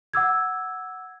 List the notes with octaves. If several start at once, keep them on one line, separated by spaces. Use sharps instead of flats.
F#5 D6 E6 G#6